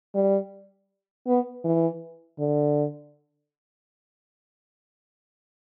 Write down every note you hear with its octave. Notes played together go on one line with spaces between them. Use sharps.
G3
B3
E3
D3